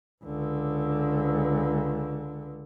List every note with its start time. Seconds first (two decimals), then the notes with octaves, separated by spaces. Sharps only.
0.24 C#2 D3